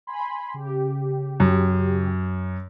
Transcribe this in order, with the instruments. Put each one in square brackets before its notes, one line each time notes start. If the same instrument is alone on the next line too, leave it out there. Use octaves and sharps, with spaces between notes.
[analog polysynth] G#5 B5 C6
C#3 G4
[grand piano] F#2